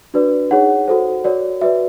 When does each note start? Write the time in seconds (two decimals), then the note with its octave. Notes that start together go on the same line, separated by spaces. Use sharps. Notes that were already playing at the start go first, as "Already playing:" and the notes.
0.14 D4 F#4 B4 D5
0.51 D#4 G#4 C#5 F#5
0.88 F#4 A4 C5
1.24 F#4 A#4 C#5 D5
1.61 F#4 B4 D5 E5